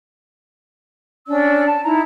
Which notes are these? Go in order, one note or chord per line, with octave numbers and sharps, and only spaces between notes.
C#4 D4 D5 E6
A5
D#4 E4 A#5